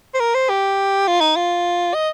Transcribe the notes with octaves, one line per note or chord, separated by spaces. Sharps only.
C5
A#4
C5
G4
F4
D#4
F4
D#5